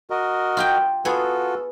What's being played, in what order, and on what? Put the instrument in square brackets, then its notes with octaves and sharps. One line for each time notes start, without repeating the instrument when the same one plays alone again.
[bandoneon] F#4 A#4 D#5
[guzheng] F4 G4 G5
[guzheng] B3 G#4 [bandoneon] F4 F#4 A4